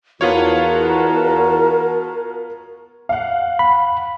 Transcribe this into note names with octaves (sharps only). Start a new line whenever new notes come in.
E2 B3 F4 F#4 A#4 C#5 A5 A#5
F5 F#5
B5